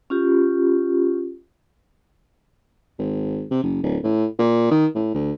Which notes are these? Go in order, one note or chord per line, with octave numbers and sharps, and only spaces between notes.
C#4 F4 G4
G#1
C3
F#1
D1
A2
A#2
D#3
A2
D2